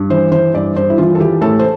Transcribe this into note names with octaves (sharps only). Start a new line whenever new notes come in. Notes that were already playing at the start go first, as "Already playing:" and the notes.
Already playing: G2
E3 C5
E3 C5
G2 D5
G2 C5
E4
E3 F4
A4
E3 G4
A2 A4
C5